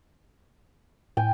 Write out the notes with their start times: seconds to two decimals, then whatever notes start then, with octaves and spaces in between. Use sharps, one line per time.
1.17 A2 G5 G#5